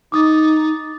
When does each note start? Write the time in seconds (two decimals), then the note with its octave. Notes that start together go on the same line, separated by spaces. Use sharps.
0.12 D#4 D6 D#6 A6